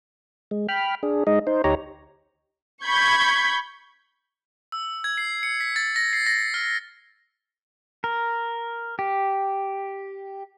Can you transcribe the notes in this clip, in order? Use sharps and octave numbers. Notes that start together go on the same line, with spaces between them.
G#3
G5 B5 F6
D4 G#4
G#3 D#4 D#5
D#4 C5
D2 D#4 G4 C#5 A#5
B5 C#6 G6 G#6 B6
E6
G#6
C7
C#7
B6
A6
A#6
C7
A#6
F6
A#4
G4